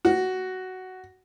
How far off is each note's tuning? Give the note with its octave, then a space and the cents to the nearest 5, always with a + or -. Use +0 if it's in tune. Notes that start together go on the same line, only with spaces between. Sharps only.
F#4 +10